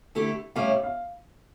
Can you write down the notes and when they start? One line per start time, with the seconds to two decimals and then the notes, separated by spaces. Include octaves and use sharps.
0.15 D3 A3 E4 G4
0.56 A2 G3 C#4 E4 F5
0.70 E5
0.83 F5